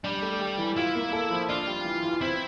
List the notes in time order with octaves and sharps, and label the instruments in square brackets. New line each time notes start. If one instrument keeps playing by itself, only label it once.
[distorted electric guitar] G3 [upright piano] D4
[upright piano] A3
G4
E3
[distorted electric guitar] E4 [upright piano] F4
[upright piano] A#3
A4
F3
[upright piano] D4 [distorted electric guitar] F4
[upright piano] G3
E3
E3
[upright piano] C4 [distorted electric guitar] E4